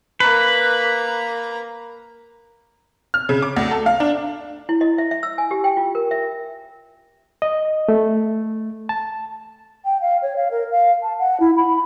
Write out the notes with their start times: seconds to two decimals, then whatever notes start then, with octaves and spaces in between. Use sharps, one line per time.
0.20 A#3 B4 A#5
3.14 F6
3.29 C#3
3.42 D6
3.56 D2
3.71 A4
3.86 F5
4.00 D4
4.69 E4
4.81 D#5
4.98 E5
5.11 E5
5.23 E6
5.38 G#5
5.51 G4
5.64 G5
5.77 F4
5.95 A#4
6.11 E5
7.42 D#5
7.89 A3
8.89 A5
9.85 G5
10.01 F5
10.22 C#5
10.36 F5
10.51 A#4
10.71 F5
11.02 A5
11.19 F#5
11.40 E4
11.56 B5